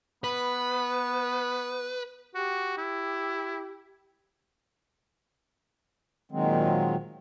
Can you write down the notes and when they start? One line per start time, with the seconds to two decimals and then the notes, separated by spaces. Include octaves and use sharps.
0.24 B3 B4
2.35 F#4 G4
2.78 E4
6.32 A#2 D#3 F#3 G#3 C4